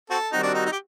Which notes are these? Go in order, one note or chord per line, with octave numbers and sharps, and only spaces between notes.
C4 F#4 A4
D#3 G3 C4 D#4 F#4
D4
D#4
D#4
G4